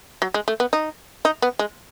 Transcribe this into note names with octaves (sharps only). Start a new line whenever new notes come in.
F#3
G#3
A3
B3
D#4
D#4
B3
G#3